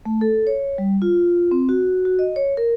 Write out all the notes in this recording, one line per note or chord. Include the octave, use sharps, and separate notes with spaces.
A3
A4
C#5
G3
F4
C4
F#4
F#4
D#5
C#5
A#4